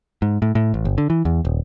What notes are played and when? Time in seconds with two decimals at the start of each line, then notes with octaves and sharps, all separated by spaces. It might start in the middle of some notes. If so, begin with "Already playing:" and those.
0.22 G#2
0.42 A2
0.55 A2
0.74 A1
0.85 G1
0.98 D3
1.10 E3
1.25 E2
1.45 D#1